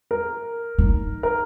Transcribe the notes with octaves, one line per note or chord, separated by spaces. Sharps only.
A#4
D#4
A#4